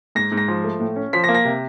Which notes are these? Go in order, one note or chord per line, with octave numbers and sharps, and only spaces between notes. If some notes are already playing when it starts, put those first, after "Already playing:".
G#2 A#6
G#2
A#6
F3
A3
A2
C#4
F3 B6
A#6
A#3
A#6
C3